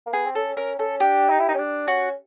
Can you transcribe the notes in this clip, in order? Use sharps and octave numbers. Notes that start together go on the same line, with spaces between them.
A#3
B3 G#4
C4
C#4 A4
C#4 A#4
C#4 A4
D4 G4
D#4
E4
D#4
C#4
D4
C#4 F#4